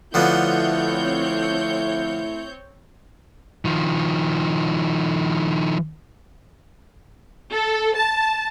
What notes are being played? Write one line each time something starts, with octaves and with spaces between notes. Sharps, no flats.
D3 F3 A3 B3 C4 E4 C#5 G6
D#3 F3
A4
A5